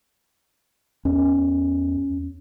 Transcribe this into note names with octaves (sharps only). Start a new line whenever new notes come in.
E2 C#4